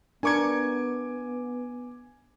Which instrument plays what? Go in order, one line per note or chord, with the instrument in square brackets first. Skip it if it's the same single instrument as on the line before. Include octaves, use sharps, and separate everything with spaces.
[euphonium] B3 [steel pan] D4 A#4 C#6 [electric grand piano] G#5 D6 G#6